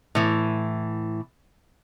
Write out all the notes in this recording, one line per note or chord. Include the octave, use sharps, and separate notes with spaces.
A2 E3